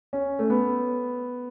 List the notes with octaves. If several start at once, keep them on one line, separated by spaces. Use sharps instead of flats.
C#4
A3
B3